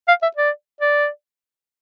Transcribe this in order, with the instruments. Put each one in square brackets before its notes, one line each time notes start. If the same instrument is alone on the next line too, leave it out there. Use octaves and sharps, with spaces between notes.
[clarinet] F5
E5
D5
D5